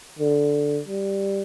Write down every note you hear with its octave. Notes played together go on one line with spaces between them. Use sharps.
D3
G3